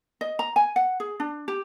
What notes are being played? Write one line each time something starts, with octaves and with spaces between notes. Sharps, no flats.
D#5
A#5
G#5
F#5
G#4
D4
G4